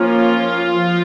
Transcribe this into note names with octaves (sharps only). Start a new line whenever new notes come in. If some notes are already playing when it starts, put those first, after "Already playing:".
Already playing: F3 A#3 C#4 F4
F3